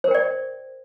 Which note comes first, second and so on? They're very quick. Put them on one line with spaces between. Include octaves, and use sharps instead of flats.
C5 A#4 G5 D5